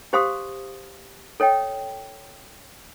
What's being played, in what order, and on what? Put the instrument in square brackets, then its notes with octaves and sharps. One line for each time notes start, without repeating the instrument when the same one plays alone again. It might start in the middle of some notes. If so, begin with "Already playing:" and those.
[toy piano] G4 C5 F5 C6 D#6
A4 C#5 D#5 G5